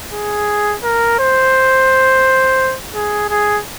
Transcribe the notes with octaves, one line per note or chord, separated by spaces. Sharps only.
G#4
A#4
C5
G#4
G#4